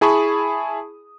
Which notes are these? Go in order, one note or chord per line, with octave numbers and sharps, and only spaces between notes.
E4 G#4 A5 B5 C#6 D#6